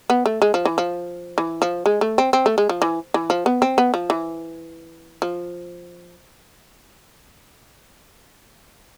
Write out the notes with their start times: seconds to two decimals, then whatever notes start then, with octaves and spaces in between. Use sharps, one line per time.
0.10 B3
0.26 A3
0.42 G#3
0.54 F3
0.65 E3
0.78 F3
1.38 E3
1.62 F3
1.86 G#3
2.01 A3
2.18 C4
2.33 C4
2.46 A3
2.58 G#3
2.69 F3
2.82 E3
3.14 E3
3.30 F3
3.46 B3
3.62 C4
3.78 B3
3.94 F3
4.10 E3
5.22 F3